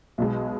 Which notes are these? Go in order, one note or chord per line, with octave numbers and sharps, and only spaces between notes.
B1 B2 G#3